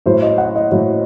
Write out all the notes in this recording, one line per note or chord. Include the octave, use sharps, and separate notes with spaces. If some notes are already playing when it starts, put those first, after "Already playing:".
A2 F#3 C5
D#5
F#5
D#5
A2 F#3